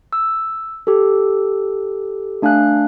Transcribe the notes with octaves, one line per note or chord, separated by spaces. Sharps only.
E6
G4 A4
A3 D4 F5 G#5 F#6